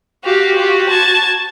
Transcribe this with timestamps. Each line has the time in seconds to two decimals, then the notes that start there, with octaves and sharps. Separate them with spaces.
0.25 F#4 G4 F5
0.55 F4 G4
0.89 A5 G#6